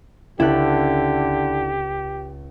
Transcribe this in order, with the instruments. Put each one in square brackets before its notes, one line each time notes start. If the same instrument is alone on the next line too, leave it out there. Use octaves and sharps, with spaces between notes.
[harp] C#2 A4 F#6 [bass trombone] D3 [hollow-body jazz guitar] E4 [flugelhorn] G4